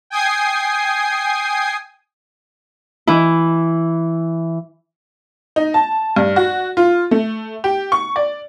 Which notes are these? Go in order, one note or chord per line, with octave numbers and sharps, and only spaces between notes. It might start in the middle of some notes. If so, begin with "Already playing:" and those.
G5 G#5 D#6 G#6 C7
E3 E4
D#4
A5
G2
F#4
F4
A3
G4
C#6
D5